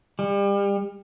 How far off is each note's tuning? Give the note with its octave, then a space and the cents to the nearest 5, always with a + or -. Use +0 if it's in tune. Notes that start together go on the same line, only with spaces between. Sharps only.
G3 +35